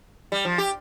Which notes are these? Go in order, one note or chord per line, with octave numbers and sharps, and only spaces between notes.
G3
F3
G4